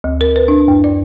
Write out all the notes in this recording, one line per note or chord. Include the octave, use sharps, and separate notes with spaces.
D2
A#4
B4
D4
F#2
D5